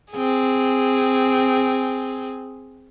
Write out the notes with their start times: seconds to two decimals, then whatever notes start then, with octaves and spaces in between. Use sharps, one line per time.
0.13 C4 G#4